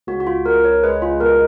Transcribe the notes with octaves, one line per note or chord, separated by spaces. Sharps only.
C#2 F#4
F#4
F4
C#2 A#4
C#5
G#3 B4
F4
B2 A#4